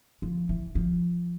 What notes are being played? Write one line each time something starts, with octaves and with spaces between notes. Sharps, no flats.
F3
E3
F3